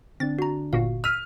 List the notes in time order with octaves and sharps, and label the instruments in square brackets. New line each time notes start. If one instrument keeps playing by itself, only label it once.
[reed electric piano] D3 D4 [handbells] C4 [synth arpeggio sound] A6
[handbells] F#4 A#5
[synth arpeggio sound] G1 A#2 F#4 [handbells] F5
[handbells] E6 B6 [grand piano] F6 [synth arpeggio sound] D#7